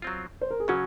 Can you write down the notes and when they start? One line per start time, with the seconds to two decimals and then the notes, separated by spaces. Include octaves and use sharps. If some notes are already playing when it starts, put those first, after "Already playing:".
0.02 F#3 C4 F4
0.41 C5
0.50 A#4
0.60 G#4
0.68 C#3 F#3 C#4 F#4